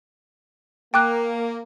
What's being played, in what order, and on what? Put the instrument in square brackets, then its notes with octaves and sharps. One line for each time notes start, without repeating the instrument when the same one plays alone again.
[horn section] A#3 [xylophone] G5 D6 F#6